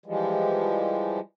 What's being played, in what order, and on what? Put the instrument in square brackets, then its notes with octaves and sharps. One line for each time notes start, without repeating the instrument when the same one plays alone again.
[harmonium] E3 F3 G3 G#3